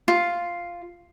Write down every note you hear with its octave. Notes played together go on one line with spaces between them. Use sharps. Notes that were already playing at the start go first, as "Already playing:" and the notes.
F4